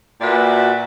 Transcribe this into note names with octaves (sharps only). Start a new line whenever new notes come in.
A#2 F#4 B4 D5 E5